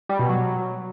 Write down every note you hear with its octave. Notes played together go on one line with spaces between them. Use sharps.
G3
B2
F#3